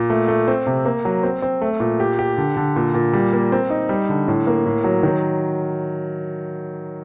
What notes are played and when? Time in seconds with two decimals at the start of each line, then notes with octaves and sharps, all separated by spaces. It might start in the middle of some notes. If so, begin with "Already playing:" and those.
Already playing: A#2
0.10 A3
0.28 A3
0.48 C4
0.67 C3
0.85 A#3
1.05 F#3
1.23 C4
1.42 C4
1.62 A3
1.80 A#2
2.00 G4
2.19 G4
2.38 D3
2.57 D3
2.76 A#2
2.94 A#2
3.13 G3
3.33 A#3
3.52 C4
3.70 D#4
3.89 G3
4.09 D3
4.28 A2
4.47 A#3
4.66 A2
4.84 F#3
5.03 D#3